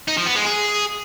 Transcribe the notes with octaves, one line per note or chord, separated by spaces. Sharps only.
D#4
F3
B3
G#3
G#4